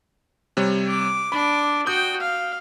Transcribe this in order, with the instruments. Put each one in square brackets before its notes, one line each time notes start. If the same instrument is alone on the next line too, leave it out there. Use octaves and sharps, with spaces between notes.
[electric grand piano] C3 G3 C#5
[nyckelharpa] D6
[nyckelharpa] D4 D6 [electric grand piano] B5
[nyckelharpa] F#4 G5 [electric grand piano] D#6 G6
[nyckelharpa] F5